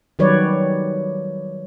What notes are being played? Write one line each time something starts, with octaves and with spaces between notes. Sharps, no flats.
D#3 F#3 G3 B4 C#5 D5